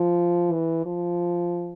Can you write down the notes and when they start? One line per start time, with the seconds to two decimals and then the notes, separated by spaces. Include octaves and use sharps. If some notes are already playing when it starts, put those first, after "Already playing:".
Already playing: F3
0.52 E3
0.86 F3